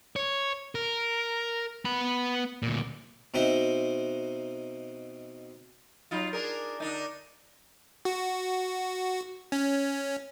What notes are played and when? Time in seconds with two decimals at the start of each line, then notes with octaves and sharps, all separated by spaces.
0.16 C#5
0.75 A#4
1.85 B3 B5
2.63 D2 A#2
3.34 B2 C4 D#4 C5 E5
6.11 F#3 D#4 F4
6.33 D4 G#4 A#4
6.80 D3 D4 D#4
8.05 F#4
9.52 C#4